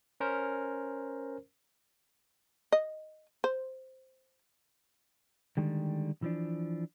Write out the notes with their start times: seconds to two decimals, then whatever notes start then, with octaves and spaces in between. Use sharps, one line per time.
0.20 C#4 A#4 C5
2.72 D#5
3.44 C5
5.57 D3 D#3 G3 G#3
6.22 E3 F3 D4